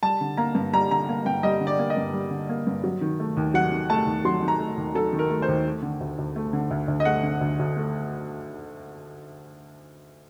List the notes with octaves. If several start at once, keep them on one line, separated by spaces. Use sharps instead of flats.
G3 A5
D3
A#3 A#5
G2
G3 A#5
D3 A#5
A#3
G2 G5
G3 D#5
D3
D5
A#3
D#5
G2
G3
D3
A#3
G2
F#3
D#3
A3
D#2
F#3 F#5
D#3
A3 A5
D#2
F#3 C6
D#3
A#5
A3
D#2
F#3 A4
D#3
A#4
A3
C5
D#2
A3
D3
D2
D2
A3
D3
D2
D2
D#5
A3 F#5
D3
D2
D2
A3